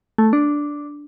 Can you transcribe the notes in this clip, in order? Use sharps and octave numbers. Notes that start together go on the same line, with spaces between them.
A3
D4